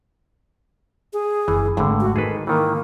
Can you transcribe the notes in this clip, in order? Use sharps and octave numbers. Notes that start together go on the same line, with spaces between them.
G#4
F#1 E3
G#1 D2 G2 D3
F#4
G#2 D#3 G#4 A4 B4
D#3 E3 A#3